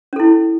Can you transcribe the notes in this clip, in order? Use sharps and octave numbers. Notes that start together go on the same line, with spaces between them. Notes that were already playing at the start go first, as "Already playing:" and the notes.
C#4 E4 A4